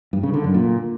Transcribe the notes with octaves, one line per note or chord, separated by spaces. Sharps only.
G2
C#3
D3
F#2
A#2